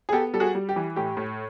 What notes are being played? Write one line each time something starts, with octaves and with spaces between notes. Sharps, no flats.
G#4
B3 G4 A4
G3 A4
F#4 G#4
G3
G4
E3
A2 G4
A2